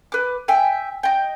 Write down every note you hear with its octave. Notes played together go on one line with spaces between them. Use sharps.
B4 D6
E5 G5 G#5
D#5 G5